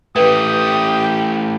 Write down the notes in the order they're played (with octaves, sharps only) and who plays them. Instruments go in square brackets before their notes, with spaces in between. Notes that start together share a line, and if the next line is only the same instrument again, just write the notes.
[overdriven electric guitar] E3 A3 [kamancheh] G4 G5 [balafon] B4 [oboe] D#6